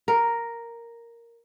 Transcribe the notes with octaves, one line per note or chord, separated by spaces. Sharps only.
A#4